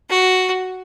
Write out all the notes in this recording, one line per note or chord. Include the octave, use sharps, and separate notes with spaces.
F#4